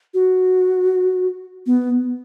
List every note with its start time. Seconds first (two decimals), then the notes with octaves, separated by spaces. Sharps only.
0.14 F#4
1.66 B3